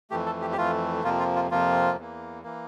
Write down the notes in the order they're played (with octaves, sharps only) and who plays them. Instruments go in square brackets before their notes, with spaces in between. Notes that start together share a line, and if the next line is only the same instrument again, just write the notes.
[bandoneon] F2 E3 A3 G4
A4
G4
G4
F2 E3 A3 F4
F2 C3 F3 A#3 F4
F4
F4
F2 C3 F3 A#3 F4
E2 E3 A#3
E3 A#3